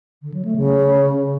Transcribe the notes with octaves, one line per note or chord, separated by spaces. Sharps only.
D3
F#3
A3
C#3